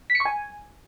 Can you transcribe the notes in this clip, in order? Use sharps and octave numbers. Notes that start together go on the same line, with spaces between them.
B6
C#7
C#6
G#5